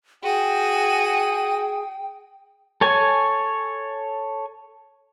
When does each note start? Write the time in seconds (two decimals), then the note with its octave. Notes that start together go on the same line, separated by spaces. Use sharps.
0.23 F#4 G#4 G5 D#7
2.81 A4 C#5 G#5